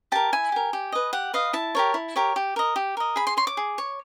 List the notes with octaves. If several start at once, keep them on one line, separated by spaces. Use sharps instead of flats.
G4 A#4 A5
E4 G#5
G4 A#4
G4
B4 D#5
G4 F#5
B4 D#5 F5
E4 A5
G4 A#4 C#5
E4
G4 A#4 C#5
G4
A#4 D#5
G4
A#4 D#5
G#4 B5
C6
C#5 C6
D6
G#4
C#5